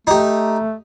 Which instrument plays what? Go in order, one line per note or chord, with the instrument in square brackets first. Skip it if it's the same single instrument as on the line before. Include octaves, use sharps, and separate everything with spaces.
[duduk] A3 [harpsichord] D#4 G4